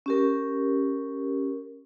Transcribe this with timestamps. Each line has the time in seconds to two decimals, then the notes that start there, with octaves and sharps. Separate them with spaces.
0.06 C#4 G4 A#4